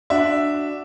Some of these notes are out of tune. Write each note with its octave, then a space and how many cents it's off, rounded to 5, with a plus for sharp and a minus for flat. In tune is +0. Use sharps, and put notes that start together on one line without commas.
D4 +0 F#4 +0 E5 +0